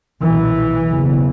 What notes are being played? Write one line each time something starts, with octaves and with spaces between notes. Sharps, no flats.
B1 A#2 E3
F#1 E2 C#3